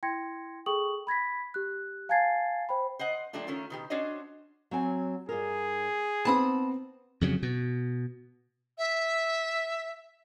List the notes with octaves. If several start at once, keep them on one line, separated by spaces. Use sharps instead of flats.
E4 G5 C6 G#6 A#6 C#7
G#4 A4 G5 C#6 D#6 F#7
B5 G#6 A#6 B6
G4 F#6
F5 G#5 A5 G#6 A6 C7
C5 G5 B5
C5 D#5 F#5
F3 G3 A3 A#3 D4 F4
D#3 A3 C#4 F4 A#4
B2 D#3 G4
C#4 D4 F#4 C5 C#5 D#5
F#3 C4 G#5
G2 G#4 A#4
B3 C4 D#4 A5 B5 D#6
F2 C#3 F#3
B2
E5